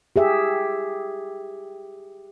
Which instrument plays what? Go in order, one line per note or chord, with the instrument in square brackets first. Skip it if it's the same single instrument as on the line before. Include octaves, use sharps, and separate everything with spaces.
[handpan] G4 G#4 E5